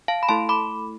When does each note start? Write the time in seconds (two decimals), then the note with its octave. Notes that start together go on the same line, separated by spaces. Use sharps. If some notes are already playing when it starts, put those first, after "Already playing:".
0.08 F5 A5
0.23 B5
0.29 A3 E4 A4 A5 C6
0.49 B5 D6